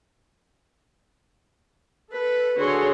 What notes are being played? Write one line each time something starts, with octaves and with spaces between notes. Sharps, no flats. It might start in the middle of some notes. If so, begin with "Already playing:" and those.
A4 B4 B6
D3 F#4 G#4 A4 C#5 C6